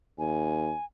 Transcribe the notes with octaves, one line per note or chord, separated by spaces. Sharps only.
D#2 G#5